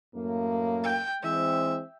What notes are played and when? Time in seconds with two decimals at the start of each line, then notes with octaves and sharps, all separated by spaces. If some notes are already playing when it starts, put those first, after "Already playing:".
0.15 F#2 A2 A#3
0.84 G5
1.23 E3 G#3 C4 E5